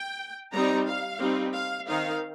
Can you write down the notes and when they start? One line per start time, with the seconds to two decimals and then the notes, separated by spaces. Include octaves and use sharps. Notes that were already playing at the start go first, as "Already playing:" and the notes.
Already playing: G5
0.52 G3 C4 D#4 A#5
0.87 F5
1.20 G3 C4 D#4
1.54 F5
1.87 D#3 C4 D#4 F5